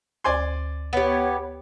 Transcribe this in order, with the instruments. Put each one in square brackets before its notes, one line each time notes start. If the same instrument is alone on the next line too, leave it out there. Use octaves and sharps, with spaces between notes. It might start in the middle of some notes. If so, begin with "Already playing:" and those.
[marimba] D2 C5 C#6 [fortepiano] D5 G#5 C6
[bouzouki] B3 G4 [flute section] C#5